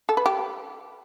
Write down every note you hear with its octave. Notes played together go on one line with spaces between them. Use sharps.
A4
B4
G4